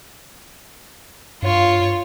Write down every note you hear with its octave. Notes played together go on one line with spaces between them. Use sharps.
G2 F4 C#5